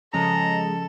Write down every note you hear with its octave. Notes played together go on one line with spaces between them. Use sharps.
C#3 F3 G#3 C#4 A4 A#5